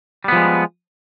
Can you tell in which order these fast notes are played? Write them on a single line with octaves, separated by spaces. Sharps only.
G3 B3 F3 G#3